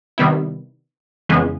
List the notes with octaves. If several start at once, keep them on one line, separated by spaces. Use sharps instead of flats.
C3 D#3 G3 B3 E4
F2 C#3 E3 G#3 B3